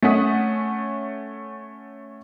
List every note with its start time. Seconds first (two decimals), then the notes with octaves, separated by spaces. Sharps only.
0.03 A3 C#4 F#5 D#6 B6